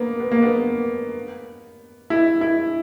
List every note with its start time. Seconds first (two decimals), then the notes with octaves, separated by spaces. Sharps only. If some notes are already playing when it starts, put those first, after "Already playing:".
Already playing: A#3 B3
0.20 B3
0.32 A#3
0.42 B3
2.10 E4
2.41 E4